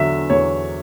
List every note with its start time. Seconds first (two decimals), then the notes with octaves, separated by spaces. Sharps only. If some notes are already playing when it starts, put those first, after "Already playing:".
Already playing: E2 D3 F#3 E5
0.30 E2 C#5